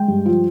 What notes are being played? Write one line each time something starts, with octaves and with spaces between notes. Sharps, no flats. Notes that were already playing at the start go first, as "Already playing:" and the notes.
Already playing: G#3 G5
G2
F3